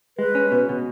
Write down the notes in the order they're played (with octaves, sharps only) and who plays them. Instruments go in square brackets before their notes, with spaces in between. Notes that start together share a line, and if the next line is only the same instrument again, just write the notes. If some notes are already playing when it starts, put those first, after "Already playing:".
[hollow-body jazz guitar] G#3 [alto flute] B4
[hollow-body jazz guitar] C#4
B2
B2